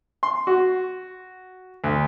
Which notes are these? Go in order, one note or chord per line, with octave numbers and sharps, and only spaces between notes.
C6
F#4
D2